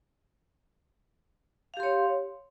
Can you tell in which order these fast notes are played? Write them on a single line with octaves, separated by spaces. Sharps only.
F5 G4 C6 C#5